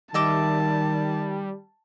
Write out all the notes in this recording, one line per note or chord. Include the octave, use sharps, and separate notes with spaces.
D#3 G3 D#5 E5 A5 D6